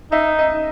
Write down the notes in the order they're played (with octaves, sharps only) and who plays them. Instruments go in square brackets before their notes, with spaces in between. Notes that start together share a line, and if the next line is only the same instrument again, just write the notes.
[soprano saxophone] D#4 [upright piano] E5
[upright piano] D#5